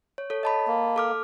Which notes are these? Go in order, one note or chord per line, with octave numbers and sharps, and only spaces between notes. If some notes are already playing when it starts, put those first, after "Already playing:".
C#5
A4 C#5
D#5 A5 B5
A#3
A4 D6 F6